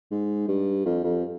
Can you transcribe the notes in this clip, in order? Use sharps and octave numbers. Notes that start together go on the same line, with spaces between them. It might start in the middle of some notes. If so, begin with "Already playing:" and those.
G#2
G2
F2
F2